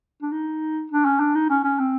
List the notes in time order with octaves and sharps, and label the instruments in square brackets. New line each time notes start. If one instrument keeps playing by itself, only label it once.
[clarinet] D4
D#4
D4
C#4
D4
D#4
C#4
C#4
C4